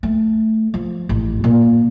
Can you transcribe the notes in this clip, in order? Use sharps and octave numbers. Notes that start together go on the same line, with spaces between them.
A3
F3
A1
A#2